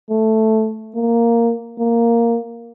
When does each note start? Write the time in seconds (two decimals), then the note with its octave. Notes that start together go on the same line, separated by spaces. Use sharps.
0.10 A3
0.95 A#3
1.79 A#3